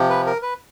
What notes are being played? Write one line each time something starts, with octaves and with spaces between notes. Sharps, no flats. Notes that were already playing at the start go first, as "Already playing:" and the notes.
Already playing: C3 F3
B4
A#4
B4